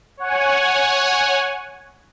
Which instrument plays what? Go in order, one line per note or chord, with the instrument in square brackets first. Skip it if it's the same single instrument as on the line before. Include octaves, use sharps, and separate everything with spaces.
[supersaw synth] C#5 F#5 G#5